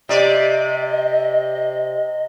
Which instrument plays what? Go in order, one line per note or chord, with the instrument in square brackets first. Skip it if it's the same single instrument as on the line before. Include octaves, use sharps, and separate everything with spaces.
[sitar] C3 D5 [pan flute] D#5